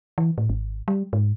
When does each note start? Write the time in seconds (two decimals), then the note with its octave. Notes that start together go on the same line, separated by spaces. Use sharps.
0.18 E3
0.38 A2
0.49 G#1
0.88 G3
1.13 G#2